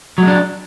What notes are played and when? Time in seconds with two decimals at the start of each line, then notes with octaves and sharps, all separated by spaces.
0.18 F#3
0.23 G#3
0.27 D4